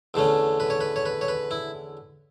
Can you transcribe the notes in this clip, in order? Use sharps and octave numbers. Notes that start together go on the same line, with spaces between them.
E2 D3 A3 C#4
B4
C#5
B4
C#5
B4
C#5
B4
E4